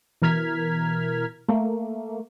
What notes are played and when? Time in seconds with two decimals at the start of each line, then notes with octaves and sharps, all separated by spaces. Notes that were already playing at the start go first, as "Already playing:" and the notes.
0.22 B2 E3 A#4 F6 G#6 B6
1.49 A3 A#3